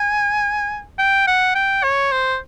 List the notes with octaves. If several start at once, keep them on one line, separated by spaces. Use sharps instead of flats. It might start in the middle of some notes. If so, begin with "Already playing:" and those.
Already playing: G#5
G5
F#5
G5
C#5
C5